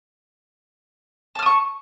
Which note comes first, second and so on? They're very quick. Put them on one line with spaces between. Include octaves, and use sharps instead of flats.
A5 F6 D#6 C#6